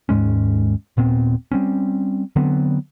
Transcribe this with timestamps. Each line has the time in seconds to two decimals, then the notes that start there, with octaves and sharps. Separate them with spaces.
0.09 D#2 G#2 G#3 C#4
0.97 D#1 A#2 B3 C4
1.52 G3 C4 C#4
2.36 D3 F#3 B3 C4